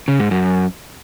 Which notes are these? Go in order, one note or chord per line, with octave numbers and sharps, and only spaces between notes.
C#3
G#2
F#2